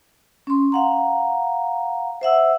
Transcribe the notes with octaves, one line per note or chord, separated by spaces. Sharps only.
C#4 C6
F5 F#5 A#5
C5 E5 F#5 E6